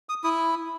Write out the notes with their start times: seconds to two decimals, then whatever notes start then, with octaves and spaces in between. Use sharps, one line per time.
0.09 D#6
0.24 E4 D#6